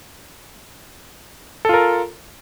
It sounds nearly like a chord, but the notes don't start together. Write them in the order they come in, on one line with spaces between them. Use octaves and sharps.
A4 F4 A#4